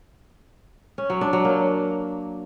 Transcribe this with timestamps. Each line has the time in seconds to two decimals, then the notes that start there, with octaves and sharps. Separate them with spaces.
0.98 C#4
1.10 F#3
1.21 D4
1.33 F#3
1.45 A#3